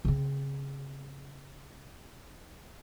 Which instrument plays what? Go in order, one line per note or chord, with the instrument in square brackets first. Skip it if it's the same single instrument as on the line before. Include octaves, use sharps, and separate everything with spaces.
[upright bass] C#3 C4